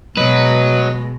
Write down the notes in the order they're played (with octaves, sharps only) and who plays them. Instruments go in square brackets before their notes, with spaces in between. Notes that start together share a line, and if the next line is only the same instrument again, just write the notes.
[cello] B2 G#3 [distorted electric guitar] F#3 [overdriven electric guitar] B4 [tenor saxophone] D#5